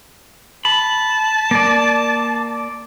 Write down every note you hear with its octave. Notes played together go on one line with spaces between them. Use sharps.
A5 B5
A#3 D5